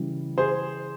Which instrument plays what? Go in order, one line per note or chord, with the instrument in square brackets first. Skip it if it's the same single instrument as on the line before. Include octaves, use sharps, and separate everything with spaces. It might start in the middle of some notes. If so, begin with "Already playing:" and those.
Already playing: [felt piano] C#3 E3 G3
[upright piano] G#4 C5